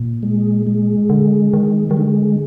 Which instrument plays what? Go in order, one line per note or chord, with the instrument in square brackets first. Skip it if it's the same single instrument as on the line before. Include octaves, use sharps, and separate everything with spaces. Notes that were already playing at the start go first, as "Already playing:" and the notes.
Already playing: [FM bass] A#2
[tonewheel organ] G#3
G#3
[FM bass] D3
D#3
[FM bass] D#3 [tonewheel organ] G3
[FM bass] D3 [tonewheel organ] G#3